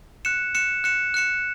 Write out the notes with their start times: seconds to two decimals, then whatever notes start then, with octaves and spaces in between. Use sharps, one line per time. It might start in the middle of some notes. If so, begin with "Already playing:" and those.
0.25 F#6 C#7 E7
0.55 F#6 C#7 E7
0.84 F#6 C#7 E7
1.14 F#6 C#7 E7